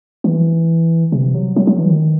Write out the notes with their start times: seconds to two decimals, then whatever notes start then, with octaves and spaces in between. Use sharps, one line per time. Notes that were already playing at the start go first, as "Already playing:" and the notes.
0.24 E3
1.12 C3
1.35 F#3
1.56 F#3
1.67 F#3
1.79 E3
1.90 D#3